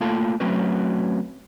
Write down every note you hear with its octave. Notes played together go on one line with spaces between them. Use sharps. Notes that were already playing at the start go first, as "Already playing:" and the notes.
A3 A#3 F4 A4 A5
F#3 A3 C4 C#4 F#4 B4